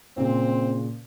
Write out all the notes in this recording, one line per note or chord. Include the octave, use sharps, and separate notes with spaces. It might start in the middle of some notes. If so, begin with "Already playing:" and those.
A#2 C#3 C4